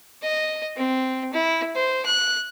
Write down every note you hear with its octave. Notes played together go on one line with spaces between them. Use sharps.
D#5
C4
E4
C5
F#6